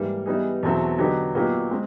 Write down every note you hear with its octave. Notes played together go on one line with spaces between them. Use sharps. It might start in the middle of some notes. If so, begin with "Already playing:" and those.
Already playing: G#2 E3 G3 A#3
E3 G3 B3 D#4 G#4
E2 B2 F#3 A3 C4
D3 F#3 B3 D#4 G4
A#2 F#3 B3 D#4 G4
G#3 C4